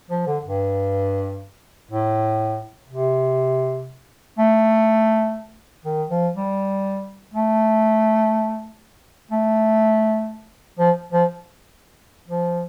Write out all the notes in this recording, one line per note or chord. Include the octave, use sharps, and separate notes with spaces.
F3
D3
G2
A2
C3
A3
D#3
F3
G3
A3
A3
F3
F3
F3